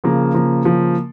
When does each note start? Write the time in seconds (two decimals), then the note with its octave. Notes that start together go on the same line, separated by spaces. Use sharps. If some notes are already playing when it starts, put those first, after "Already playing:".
0.04 C#3 F3 A#3
0.34 C#3 F3 A#3
0.65 C#3 F3 A#3